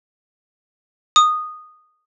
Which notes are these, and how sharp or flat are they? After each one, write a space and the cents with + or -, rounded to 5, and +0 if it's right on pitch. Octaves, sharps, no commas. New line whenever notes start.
D#6 -10